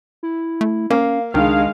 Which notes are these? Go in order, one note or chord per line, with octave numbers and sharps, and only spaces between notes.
E4
A3
A#3 C#4 F5
C#2 D#3 G#3 D4 F5